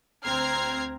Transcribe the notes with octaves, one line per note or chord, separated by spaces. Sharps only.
D2 C4 A#5 F6 G#6 C7